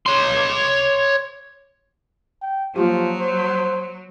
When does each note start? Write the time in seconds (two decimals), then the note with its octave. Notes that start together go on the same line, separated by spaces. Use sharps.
0.06 C#5 C6
2.42 G5
2.76 F3 F#3 A#3 F4 G4
3.20 C5